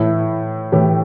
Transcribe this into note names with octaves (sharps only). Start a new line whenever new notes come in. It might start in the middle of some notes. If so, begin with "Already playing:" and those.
Already playing: A2 E3 A3 E4
A2 E3 A3 G4